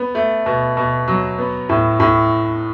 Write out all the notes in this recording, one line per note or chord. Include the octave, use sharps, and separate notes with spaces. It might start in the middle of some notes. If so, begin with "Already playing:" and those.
Already playing: B3
A3
B2
B2
F#3
B3
A2
A2